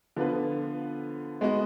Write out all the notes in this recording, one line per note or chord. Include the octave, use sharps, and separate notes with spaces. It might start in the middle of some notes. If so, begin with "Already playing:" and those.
D3 F3 B3 F4 B4
G#3 B3 D#4 F#4